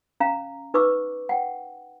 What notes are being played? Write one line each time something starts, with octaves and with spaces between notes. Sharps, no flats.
C#4 F5 A#5
D#4 B4 C#6 D6 E6
F#5 G5